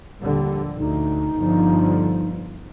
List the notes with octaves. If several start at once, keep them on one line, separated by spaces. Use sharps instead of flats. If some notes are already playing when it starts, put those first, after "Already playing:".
A#1 D#2 D3 G3
D2 D#4
G1 D3 F3